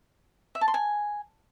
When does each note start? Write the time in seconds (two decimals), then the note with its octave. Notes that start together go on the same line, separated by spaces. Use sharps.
0.55 E5
0.61 A5
0.68 C6
0.74 G#5